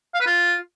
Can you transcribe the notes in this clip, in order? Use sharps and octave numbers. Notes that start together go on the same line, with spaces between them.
F5
B4
F4